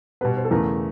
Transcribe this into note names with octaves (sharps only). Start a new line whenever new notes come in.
B2 G3 B3 B4
C5
A4
E2 C#3 E3 A3 A#4